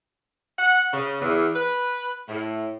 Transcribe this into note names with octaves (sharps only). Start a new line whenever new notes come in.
F#5
C#3
E2
B4
A2